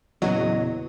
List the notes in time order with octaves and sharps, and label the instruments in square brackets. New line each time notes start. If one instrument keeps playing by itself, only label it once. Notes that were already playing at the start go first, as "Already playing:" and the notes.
[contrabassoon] E2 [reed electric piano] A#2 C#3 [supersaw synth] F#3 [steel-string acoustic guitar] D#5